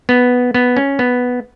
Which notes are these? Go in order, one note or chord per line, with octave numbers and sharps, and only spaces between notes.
B3
B3
C#4
B3